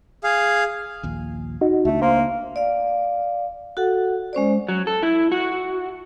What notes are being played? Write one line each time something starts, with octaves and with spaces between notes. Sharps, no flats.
G#4 F5
A#1 D#2 A#2
D#4 F#4
C#2 A3 D4
A#3 C5
D5 F5
F#4 A4 F#5
G#3 C#4 C5 D5
F#3
A4
E4
F#4